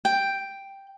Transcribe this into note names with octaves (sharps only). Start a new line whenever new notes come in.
G5